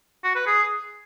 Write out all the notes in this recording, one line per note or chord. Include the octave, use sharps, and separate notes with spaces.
F#4
B4
G#4